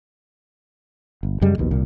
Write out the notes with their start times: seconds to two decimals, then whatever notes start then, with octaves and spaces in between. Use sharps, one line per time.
1.23 G1
1.41 F#2 C#3 G3 G#3
1.58 A#1 D#2 B2
1.71 C2 A#2